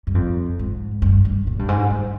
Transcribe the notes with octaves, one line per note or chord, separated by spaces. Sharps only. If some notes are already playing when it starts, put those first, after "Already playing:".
G2
F2
G#2
G2
G2
A#2
G2
G#2
G2